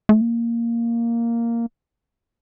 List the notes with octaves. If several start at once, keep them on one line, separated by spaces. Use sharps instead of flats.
A3
A#3